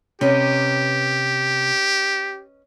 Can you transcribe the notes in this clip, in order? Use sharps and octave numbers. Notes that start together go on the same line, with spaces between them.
C3 C#4 G4 B4 D#5